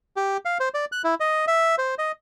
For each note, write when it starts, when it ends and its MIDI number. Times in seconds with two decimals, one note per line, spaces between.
0.17 0.37 67
0.45 0.58 77
0.60 0.69 72
0.74 0.85 74
0.92 1.02 90
1.04 1.15 64
1.20 1.45 75
1.47 1.75 76
1.78 1.95 72
1.98 2.12 75